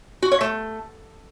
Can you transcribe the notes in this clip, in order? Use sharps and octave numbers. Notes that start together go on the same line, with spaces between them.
F#4
C#5
A3